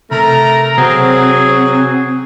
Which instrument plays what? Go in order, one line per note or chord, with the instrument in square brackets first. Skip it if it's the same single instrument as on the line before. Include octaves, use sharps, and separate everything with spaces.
[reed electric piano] C3 [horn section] A3 A#5 [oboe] A#4
[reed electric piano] C3 [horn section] F#3 [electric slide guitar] C4 [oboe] G#4